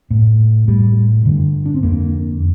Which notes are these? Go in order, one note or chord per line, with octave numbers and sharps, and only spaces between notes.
A2
A2 G3
G2 D3
D4
C4
F2 D3 A#3